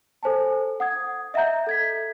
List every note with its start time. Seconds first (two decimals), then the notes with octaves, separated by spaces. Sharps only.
0.23 A4 C5 G#5 A5
0.80 F#5 D#6 G#6
1.34 D#5 E5 F#5 A#5 G6
1.67 A4 G#6 B6